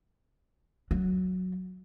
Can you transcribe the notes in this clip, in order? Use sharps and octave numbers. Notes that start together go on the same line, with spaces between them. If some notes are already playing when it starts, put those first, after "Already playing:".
F#3